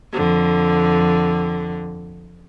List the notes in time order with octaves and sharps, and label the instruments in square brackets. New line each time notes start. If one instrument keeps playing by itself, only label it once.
[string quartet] F2 D3